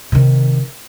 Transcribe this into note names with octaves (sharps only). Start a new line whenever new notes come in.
C3 D#3